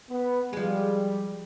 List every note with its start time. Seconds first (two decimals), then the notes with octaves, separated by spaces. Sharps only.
0.10 B3
0.53 F3 G3 G#3